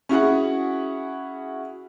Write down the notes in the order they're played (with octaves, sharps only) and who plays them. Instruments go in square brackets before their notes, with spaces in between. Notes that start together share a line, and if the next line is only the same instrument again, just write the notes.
[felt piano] C#4 E4 F#4 G#4 F#5